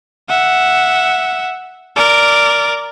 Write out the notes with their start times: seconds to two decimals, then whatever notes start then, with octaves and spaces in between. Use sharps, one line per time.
0.28 E5 F#5
1.96 A#4 D5